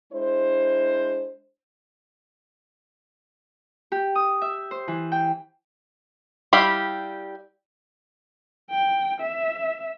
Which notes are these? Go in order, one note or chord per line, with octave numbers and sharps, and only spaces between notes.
G#3 D4 E4 C5
G4
D#6
E5
C5
E3
G5
G3 E4 G4 F5 B5
G5
E5